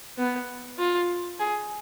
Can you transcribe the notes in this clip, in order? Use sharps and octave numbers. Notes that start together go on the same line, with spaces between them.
B3
F4
G#4